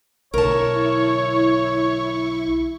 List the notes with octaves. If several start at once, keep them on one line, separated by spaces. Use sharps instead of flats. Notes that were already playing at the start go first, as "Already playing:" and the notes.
B1 D3 E4 A#4 C#5 A5 C#6